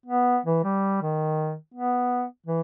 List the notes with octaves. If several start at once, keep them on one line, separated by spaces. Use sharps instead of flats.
B3
E3
G3
D#3
B3
E3